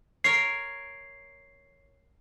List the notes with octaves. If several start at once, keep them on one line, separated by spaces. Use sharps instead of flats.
A#4 C#5 C7